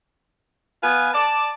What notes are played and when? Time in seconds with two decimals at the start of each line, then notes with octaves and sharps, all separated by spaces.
0.82 B3 B4 F5 G#5
1.13 D5 A5